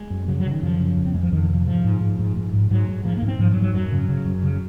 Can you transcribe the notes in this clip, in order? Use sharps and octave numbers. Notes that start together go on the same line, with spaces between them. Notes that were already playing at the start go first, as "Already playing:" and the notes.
Already playing: G#3
F#2
C#3 F#3
F#3
C#3
D#3
F#2 F3
C#3
F2
C4
F2 G#3
F3
F2 D#3
D#3
C3
F3
G#2 F3
G#2
G#2
G#2
G#2
G#2
G#2 F#3
G#2
G#2 F3
G#2 A#3
C4
G#2 F3
F#3
G#2
F#3
F#2 F#3
C#3
C#3
F#2
C#3